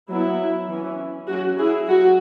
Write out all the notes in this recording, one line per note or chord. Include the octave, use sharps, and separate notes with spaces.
F#3 B3 E4
E3 C#4
F#3 C#4 F#4
E4 G#4
F#3 F#4